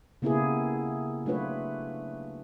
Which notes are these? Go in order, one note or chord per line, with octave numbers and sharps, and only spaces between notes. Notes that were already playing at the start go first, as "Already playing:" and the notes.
C#3 A#3 B3 E4 G4 G#4
F#3 A3 D4 F4 B4 C#5